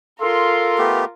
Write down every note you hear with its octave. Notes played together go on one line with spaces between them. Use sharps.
F4 A4 A#4 C6
A3 B3 G4